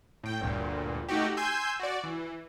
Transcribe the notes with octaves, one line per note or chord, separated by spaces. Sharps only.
A2 G5
G1 D2 G2 A#2
A3 D#4 F#4 G4
G#5 C6 E6 G6
F#4 D5
E3